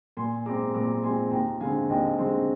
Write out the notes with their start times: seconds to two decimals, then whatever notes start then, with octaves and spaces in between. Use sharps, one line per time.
0.17 A#2 G#5 C6
0.46 G#3 C4 A#5 D6
0.74 A#2 A#5 D6
1.03 G#3 G#5 C6
1.08 C4
1.31 D#2 G5 A#5
1.61 D3 G#3 C4 F5 G#5
1.89 D#2 D#5 G5
2.18 D3 G#3 C4